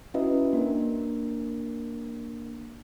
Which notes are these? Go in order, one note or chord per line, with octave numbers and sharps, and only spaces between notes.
C#4 E4 F#4 B4 D#5 E5
A#3 D4 A#4